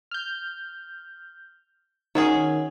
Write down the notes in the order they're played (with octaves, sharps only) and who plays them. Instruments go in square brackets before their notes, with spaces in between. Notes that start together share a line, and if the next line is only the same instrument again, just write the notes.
[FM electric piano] F6 G6
[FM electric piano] D#3 [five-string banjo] F#3 C#4 G#4